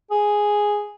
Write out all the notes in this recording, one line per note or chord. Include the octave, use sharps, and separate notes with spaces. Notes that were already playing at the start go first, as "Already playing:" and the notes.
G#4